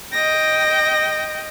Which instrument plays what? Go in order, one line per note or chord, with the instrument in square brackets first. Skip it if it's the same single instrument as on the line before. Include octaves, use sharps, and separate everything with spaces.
[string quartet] D#5 G5 A#6